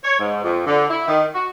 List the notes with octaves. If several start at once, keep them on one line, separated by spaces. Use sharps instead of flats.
C#5
G#2
F2
D3
E4
D#3
F#4